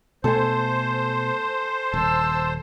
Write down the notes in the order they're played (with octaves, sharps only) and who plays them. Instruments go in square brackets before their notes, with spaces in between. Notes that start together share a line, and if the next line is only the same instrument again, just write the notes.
[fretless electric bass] B2 A3 [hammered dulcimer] A4 G#5 [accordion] C5
[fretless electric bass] D#1 [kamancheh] A5 E6